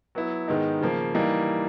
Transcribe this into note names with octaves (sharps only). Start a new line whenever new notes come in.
F#3 B3 E4
G#2 D#3 G#3 B3 D#4
C#3 F3 A#3
E3 G3 A#3 D#4